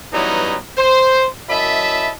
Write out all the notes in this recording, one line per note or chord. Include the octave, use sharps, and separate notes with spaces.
E3 F#3 G3 B3 C#4 D#4
C5
F#2 E4 D#5 E5 A5 B5